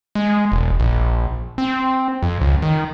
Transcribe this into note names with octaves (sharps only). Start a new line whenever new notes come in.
G#3
E1
A#1
C4
F2
C#2
D#3